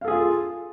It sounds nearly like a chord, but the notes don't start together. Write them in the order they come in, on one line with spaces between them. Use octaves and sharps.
F5 A4 G#4 F4